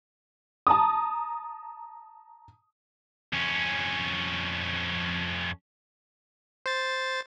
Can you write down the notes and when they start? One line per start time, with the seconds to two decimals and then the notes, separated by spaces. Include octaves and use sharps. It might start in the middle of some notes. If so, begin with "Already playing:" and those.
0.67 A5 A#5 D#6
3.33 F2 C#4
6.66 C5 A6